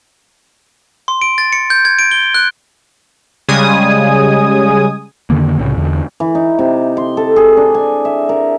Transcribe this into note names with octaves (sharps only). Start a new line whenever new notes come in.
C6
D7
A6
C#7
G6
G#6
D7
G7
F#6
C#3 G3 G#3 G#5 D#6
F2 D3 D#3 A#3
C2 A2 C#3
E2 D3
E3
D#4
C3
C6
A4
G#4
D4
G#5
E5
A#4